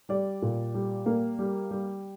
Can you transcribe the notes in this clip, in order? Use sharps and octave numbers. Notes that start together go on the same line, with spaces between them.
G3 D5
A#2
G3
A#3
G3
G3